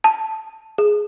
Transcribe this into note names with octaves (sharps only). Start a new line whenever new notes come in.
A5
G#4